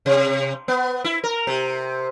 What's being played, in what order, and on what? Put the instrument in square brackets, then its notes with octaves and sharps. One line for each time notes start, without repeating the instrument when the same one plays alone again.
[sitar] C3
B3
E4
A#4
C3